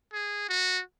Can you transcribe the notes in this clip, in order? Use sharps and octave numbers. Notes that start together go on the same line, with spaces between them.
G#4
F#4